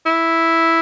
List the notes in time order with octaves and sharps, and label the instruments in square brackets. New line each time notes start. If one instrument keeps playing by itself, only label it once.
[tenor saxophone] E4